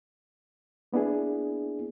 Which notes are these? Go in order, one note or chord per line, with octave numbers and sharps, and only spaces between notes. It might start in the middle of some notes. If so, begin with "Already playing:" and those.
A#3 B3 D4 E4 G#4